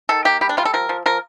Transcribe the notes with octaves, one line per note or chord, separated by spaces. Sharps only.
D#3 A4
A#3 G4
G3 G4
D4
G3 F4
A4
F3 A#4
F3
F3 A#4